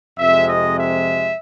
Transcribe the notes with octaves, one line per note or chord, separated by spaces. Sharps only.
F2 C3 F3 G#3 E5
D#5
E5